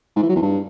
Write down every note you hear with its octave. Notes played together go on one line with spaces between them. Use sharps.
G#2
E3
F#3
E2
G2